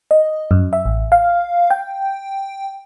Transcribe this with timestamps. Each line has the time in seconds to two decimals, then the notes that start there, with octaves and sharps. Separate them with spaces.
0.11 D#5
0.51 F#2
0.73 E5
0.86 A1
1.12 F5
1.70 G5